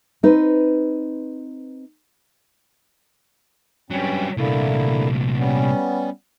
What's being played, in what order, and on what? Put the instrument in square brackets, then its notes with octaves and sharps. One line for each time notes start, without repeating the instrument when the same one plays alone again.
[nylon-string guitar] C4 D#4 B4
[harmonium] G2 C4 C#4 [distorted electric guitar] F#3 G3
[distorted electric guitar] C2 A#2 [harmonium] D3 A#3 E4
[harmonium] G3 B3 C#4